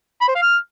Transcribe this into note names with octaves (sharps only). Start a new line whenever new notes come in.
B5
C5
F5
F6